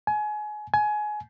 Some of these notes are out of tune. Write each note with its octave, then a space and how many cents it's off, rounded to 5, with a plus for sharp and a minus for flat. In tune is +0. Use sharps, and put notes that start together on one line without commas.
G#5 +25
G#5 +20